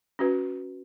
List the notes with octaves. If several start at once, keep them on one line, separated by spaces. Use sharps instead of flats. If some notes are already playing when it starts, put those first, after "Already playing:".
C#4 F#4 B4